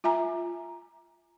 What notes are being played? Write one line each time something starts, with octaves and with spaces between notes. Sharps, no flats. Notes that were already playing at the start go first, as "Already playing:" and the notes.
F4 E5 G#5 A#5